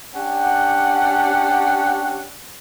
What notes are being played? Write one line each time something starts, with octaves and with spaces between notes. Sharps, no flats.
C#4 D4 G4 F#5